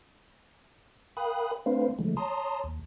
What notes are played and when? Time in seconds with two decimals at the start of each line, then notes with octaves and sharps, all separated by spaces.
1.17 A#4 F5 G5 B5 D#6 F#6
1.66 A3 C4 D4 B4 C5 F5
1.99 D3 F3 G#3 A3
2.17 C#5 A5 A#5 C6 D#6
2.64 D#2